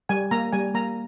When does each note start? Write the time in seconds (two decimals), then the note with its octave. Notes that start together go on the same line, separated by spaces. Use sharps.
0.09 G3 G#5
0.31 A#3 A#5
0.53 G3 G#5
0.74 A#3 A#5